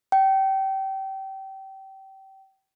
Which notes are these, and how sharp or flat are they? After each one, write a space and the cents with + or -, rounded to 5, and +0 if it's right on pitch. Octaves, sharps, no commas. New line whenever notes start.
G5 -25